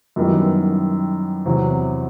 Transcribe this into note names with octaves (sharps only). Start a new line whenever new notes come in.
F#2 D#3 G3 B3 E4
E2 C3 F#3